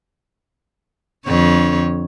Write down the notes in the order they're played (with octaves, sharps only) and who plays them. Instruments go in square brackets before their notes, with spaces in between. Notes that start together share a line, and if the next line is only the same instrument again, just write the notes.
[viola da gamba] F2 D3 C#5